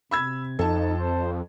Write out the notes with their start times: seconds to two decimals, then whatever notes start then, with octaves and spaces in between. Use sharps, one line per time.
0.11 C3 B5 E6 G#6
0.59 F2 D#4 A4 A5
0.98 C5